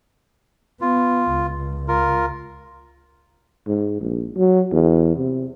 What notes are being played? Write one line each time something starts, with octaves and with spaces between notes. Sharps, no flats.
B3 F4
C#2
F4 A#4
G#2
A#1
F#3
E2
C3